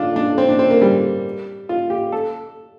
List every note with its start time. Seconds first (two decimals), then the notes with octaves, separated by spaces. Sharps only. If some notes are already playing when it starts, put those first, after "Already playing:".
Already playing: D4 F4
0.16 D4
0.38 C4
0.49 D4
0.59 C4
0.70 A#3
0.82 G3
1.69 F4
1.90 G4
2.12 A4